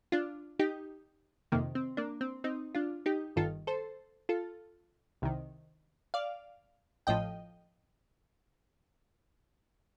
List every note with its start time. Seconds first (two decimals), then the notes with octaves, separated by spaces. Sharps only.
0.12 D4 F4
0.59 D#4 G4
1.52 F2 C3 D#3 A#3
1.75 C4
1.97 A#3 D4
2.21 C4
2.44 C4 D#4
2.75 D4 F4
3.06 D#4 G4
3.36 G1 G2 D#3 F4 A4
3.67 A4 C5
4.29 F4 A4
5.22 C2 C3 D#3
6.14 D5 F5
7.07 A1 A2 F3 D#5 G5